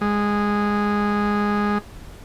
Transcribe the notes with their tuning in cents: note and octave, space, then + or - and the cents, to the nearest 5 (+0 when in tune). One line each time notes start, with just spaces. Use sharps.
G#3 -10